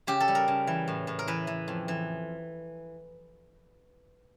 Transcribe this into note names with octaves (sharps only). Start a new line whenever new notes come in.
C#3 G4
A4
G3
A#4
C#3
E3
A2
A2
A#4
E3 B4
E3
F2
E3